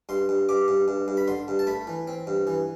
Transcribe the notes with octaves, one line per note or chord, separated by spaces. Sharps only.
G2 C6
G2
G2 D6
G2
G2
G2
B5
D3 C6
G2
A5
A3 B5
E3
C4
G2
E3